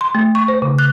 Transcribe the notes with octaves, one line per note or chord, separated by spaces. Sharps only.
C6
A3
C#6
C5
C#3
F#6